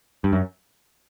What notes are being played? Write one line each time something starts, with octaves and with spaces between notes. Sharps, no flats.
G2
F#2